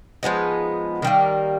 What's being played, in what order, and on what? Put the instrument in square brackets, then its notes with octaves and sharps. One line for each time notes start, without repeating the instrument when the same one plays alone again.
[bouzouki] F3 G#3 B3 D#4
D#3 G3 A#3